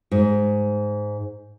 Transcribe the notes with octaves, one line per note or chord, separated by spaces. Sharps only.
G#2